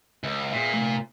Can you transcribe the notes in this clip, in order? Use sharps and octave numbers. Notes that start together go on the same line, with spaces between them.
C#2
A#2 G#4 B4 E5
C3 E3 A3